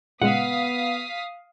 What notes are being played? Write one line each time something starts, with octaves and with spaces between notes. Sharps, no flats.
A#2 C#3 G#3 B3 F5 F#5 D#6 B6